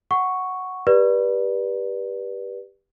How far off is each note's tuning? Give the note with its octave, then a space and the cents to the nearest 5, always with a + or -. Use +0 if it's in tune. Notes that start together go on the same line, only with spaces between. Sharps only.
F#5 +0 C#6 +0
G4 +5 B4 -25 D5 +5